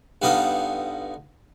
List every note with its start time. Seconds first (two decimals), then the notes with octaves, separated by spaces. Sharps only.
0.22 G2 G3 B3 D#4 F4 A4